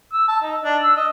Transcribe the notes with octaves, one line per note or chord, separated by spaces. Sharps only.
E6
A5
D#4
D4
E6
D#5